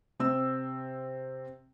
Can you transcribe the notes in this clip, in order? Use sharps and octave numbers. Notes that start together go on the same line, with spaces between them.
C3 C4 E6